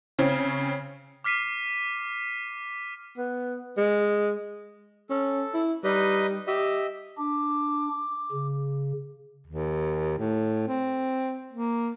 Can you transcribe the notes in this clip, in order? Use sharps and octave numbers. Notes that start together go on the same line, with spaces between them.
C#3 C4 C#4
D6 F6 B6 C7 D#7
B3
G#3
C#4 A4
E4
G3 D#4 B4 D#5
G4 D#5 E5
D4 D6
C#3
D#2
A2
C4
A#3